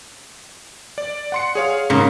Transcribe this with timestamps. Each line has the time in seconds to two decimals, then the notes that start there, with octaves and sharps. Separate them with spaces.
0.98 D5
1.32 F#5 C6 C#7
1.55 G#4 C#5 F5
1.90 G#2 C#3 A#3